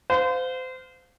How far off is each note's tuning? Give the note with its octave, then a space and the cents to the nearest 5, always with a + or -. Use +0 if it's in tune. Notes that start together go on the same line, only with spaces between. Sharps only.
C5 -30 F5 +20